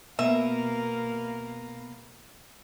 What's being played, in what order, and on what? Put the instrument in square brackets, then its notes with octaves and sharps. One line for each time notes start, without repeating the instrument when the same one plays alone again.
[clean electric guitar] B2 B3 [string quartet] A#3 A#4 F5 [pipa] E5